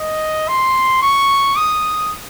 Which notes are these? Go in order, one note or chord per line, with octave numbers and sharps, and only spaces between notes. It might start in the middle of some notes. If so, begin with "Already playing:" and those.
Already playing: D#5
C6
C#6
D#6